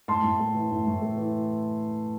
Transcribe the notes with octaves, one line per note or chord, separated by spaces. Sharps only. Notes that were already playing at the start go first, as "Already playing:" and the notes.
A2 A5 C6
A2
A3
E3
A2
A2
A3
E3